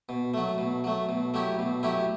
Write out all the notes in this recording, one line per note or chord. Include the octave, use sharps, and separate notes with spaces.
B2
F#3 A3
B2
F#3 A3
B2
F#3 A3 E4 G4
B2
F#3 A3 E4 G4